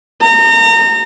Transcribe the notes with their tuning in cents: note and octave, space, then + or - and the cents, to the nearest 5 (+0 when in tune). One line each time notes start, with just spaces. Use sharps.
A#5 -30